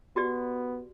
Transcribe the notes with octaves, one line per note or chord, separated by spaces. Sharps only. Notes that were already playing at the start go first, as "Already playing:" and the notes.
B3 F#4 G4 D5